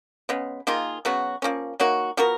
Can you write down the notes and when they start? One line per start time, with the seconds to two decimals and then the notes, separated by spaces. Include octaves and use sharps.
0.29 C#3 G#3 B3
0.67 D#3 A#3 F4 G#4
1.05 C#3 F#3 B3 F#4
1.42 F3 A#3 C#4
1.80 F#3 A#3 D#4 F#4
2.17 F3 B3 F#4 A#4